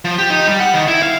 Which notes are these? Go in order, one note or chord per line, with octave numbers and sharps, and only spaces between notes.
F3
G4
D#4
G3
F#5
D#3
E4
F5